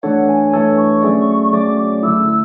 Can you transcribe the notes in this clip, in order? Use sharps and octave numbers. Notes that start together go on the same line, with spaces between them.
E3 A3 D4 A4 C#5 F#5
G#5
E3 A3 D4 A4 C#5
C#6
F#3 A3 C#4 G#4 D5
F#3 A3 C#4 G#4 D5 D6
D6
D3 A3 E4 E6